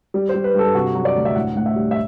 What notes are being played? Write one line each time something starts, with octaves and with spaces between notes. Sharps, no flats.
G3
C5
G3
B4
G2 A4
C3 F#4
F#3
D5
D2
E5
A2 F#5
A2 F#5
E5
G3
E5